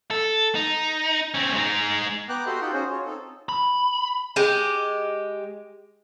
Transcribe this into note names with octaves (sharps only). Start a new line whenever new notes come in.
A4
D#4
C4 C#4
G#3 D#4
B3 G5 A#5 D6 F#6
F#4 G4 A4 D#5 E5 C6
D#4 F4 F#5 G5
C#4 D#4 F#4 G#4 C5
F4 C#5
C4 D#4 A4
B5
G#3 G4